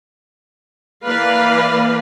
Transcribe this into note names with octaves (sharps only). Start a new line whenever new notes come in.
E3 A#3 B4 D5 F5